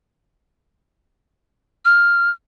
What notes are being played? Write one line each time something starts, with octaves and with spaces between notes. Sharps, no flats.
F6